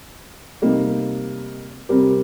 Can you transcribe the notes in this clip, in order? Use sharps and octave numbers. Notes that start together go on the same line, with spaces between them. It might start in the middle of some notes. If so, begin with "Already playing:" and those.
C3 G3 A#3 D#4
C3 G3 C4 G4 A#4